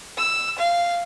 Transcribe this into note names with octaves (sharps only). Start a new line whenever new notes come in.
E6
F5